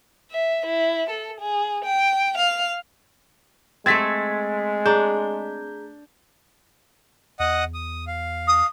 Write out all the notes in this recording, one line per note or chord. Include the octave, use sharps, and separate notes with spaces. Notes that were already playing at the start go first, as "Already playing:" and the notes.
E5
E4
A4
G#4
G5
F5
G#3 A3 C4 G#6 A6 B6
D4 G#4 A#5 G6
E2 D#5 F#5 D#6
D#6
F5
D#6